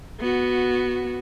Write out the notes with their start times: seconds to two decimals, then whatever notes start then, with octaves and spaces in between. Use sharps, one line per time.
0.20 B3 F#4